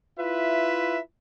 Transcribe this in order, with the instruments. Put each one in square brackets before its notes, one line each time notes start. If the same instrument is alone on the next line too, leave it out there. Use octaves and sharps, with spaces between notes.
[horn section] E4 F4 B4 E5